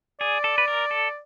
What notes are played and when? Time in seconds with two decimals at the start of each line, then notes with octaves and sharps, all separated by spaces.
0.20 G#4 D5
0.44 A4
0.58 B4
0.68 A#4
0.91 A4